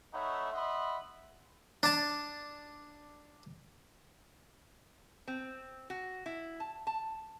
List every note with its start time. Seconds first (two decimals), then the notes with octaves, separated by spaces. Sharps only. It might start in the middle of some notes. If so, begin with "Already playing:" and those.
0.14 A3 D#4 C#5 E5 F#5 B5
0.53 D#5 E5 F#5 B5 C6
1.83 D4 A5
5.28 C4
5.90 F#4
6.26 E4
6.60 A5
6.87 A5